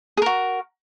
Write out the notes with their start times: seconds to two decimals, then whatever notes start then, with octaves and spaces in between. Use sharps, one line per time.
0.17 G#4
0.22 A#4
0.26 F#4